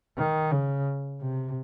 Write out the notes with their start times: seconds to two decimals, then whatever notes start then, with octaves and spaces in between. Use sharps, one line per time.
0.18 D#3
0.52 C#3
1.21 C3